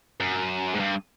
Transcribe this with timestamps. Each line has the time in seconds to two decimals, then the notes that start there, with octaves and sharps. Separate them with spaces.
0.20 F#2
0.75 G#2
0.80 G2